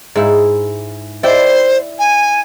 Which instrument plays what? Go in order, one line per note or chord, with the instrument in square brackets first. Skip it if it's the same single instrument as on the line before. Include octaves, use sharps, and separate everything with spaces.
[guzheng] G#2 E4
[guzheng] E4 D5 G5 [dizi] C5
[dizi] G#5